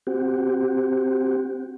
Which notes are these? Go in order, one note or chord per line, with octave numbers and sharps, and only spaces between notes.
C4 F#4 G4